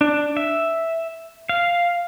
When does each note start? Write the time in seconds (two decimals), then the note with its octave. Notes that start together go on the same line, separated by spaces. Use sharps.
0.01 D4
0.37 E5
1.49 F5